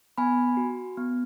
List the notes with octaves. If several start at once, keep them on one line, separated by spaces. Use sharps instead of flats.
B3 G#5 B5
F#4
B3